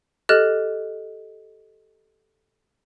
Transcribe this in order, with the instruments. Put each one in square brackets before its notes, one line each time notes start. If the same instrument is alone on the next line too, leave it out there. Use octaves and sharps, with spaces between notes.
[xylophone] G4 A4 D#5 F6 F#6 A6